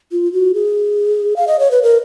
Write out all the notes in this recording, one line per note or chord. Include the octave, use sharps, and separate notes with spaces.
F4
F#4
G#4
F5
D#5
C#5
B4
A#4